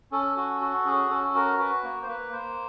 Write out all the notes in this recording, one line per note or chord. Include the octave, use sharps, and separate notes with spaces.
C#4 A4
F#4
F#4
C#4 G#4
C#4 A4
F#4 A#4
F#4 B4
A#3
C5
A#3 B4
A#3 C5